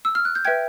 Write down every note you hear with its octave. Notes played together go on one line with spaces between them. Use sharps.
E6
F6
F#6
G6
B4 E5 G5 G#6